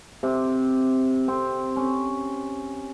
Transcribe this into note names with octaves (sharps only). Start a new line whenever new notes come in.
C3
C4
C#4